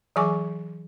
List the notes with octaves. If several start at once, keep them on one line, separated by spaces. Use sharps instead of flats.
E3 F#3 G#4 G#5 C#6 D6